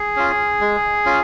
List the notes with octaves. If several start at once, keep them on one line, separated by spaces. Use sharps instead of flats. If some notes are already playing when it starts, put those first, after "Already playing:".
Already playing: G#4
C#4 F4
G#3
C#4 F4